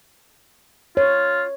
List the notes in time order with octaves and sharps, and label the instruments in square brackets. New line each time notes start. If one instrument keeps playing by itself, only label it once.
[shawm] F4 [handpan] C#5